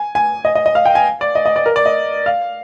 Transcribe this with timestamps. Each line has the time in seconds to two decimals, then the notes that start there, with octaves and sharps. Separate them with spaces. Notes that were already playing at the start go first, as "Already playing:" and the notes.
Already playing: G#5
0.15 G#5
0.45 D#5
0.55 D#5
0.66 D#5
0.75 F5
0.86 G5
0.95 G#5
1.21 D5
1.35 D#5
1.46 D#5
1.56 D5
1.66 A#4
1.76 D5
1.86 D#5
2.26 F5